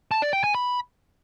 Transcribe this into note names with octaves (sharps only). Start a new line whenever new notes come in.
A5
D5
G5
G#5
B5